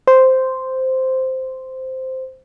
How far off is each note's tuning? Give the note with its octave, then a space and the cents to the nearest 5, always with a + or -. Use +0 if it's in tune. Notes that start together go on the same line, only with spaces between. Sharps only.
C5 -5